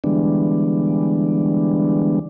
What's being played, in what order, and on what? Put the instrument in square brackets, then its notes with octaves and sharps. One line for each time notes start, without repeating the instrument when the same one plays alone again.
[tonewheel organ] D3 E3 G3 G#3 B3 D4